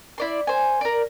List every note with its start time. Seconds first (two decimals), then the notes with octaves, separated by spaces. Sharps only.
0.18 E4 D5 C6
0.47 C5 G#5
0.81 A#4 D5